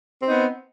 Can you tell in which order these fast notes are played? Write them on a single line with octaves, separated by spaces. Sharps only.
C4 D#4 B3